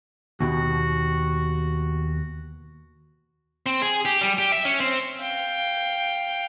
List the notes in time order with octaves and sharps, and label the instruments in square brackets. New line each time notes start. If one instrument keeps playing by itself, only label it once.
[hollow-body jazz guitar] D#2 B2 [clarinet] F#4
[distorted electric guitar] C4
G#4
G4
G3
G4
E5
C#4
C4
[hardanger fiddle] F5 G5